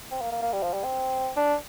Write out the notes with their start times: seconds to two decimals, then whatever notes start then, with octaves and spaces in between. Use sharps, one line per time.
0.11 C4
0.21 A#3
0.32 A#3
0.42 A#3
0.53 G3
0.63 F3
0.73 G3
0.84 C4
1.36 D4